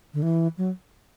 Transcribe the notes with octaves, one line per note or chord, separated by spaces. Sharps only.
D3
E3
F#3